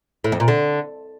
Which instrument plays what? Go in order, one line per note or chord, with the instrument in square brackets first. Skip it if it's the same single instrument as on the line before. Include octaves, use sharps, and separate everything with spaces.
[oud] A2
F2
A#2
D3